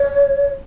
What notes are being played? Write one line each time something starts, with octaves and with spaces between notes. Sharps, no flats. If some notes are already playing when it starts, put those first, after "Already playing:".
Already playing: C#5